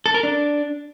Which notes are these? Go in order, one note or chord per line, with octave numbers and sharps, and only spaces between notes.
A4
A#4
D4